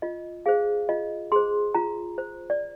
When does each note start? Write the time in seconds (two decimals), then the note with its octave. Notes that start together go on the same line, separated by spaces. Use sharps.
0.02 F4 D#5
0.46 G#4 C5 F5
0.89 F4 D#5
1.32 G#4 C5 C6
1.75 F4 A#5
2.18 C5
2.50 D5